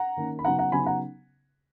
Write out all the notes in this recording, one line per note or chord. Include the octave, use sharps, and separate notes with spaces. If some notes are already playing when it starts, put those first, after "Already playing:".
Already playing: F#5 A#5
D#3 A#3 C#4
B5
C#3 F#3 B3 D#4 F#5 A#5
F#5 A#5
C#3 F#3 B3 D#4 G#5 B5
F#5 A#5